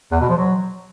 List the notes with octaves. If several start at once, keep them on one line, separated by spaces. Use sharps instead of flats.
E2
B2
F3
F#3